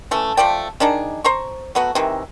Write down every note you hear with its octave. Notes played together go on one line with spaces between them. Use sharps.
E3 A3 C#4
F3 A3 D5 G5
D#3 D4 D#4 G#4
C5 A#5 C#6
F#3 A3 B3 F#4
C3 D#3 E3